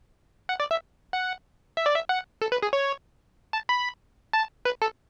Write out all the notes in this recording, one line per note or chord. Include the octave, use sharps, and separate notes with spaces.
F#5
D5
E5
F#5
E5
D5
E5
F#5
A4
B4
G#4
C#5
A5
B5
A5
B4
A4